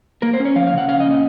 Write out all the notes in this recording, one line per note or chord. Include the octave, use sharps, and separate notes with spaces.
A#3 A#4
C5
C#4
C#5
F3 F5
F5
C#3 F#5
C#4 F5
D#5
A#2
D#5